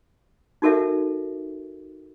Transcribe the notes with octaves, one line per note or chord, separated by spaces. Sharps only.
D#4 F#4 A4 A#4 E5